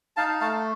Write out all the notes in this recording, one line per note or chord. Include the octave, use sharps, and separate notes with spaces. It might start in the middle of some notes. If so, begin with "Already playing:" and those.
D#4 F5 A5
A3 F5 A5